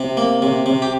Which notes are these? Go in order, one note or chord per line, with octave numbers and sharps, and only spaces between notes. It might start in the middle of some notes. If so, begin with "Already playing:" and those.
Already playing: C3
A#3
C3
C3
G4